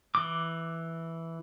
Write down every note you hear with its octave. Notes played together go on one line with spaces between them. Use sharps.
E3 D6